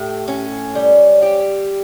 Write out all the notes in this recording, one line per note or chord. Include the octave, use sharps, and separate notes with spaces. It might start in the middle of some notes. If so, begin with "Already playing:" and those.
Already playing: A2 G4
C#4
G3
G4